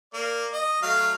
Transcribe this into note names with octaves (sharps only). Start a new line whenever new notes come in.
A#3 D5
D#5
F#3 A3 F5